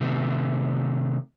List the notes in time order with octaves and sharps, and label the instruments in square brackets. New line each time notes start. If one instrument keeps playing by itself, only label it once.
[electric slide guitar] C3 D#3 A3 B3